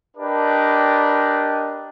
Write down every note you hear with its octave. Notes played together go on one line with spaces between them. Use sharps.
D4 G4 A#4 B4 D5 D#5